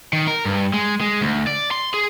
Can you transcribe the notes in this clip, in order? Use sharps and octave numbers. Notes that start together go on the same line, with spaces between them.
D#3
A#4
G2
G#3
G#3
D2
D5
C6
G#4